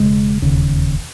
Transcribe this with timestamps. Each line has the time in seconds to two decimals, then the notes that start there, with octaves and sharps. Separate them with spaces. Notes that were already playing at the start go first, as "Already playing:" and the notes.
Already playing: E1 C#3 G#3
0.42 E1 D#2 C#3